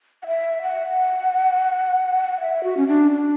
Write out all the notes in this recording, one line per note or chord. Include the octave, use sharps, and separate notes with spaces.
F#5
E5
F#5
E5
F#4
C#4
D4
D4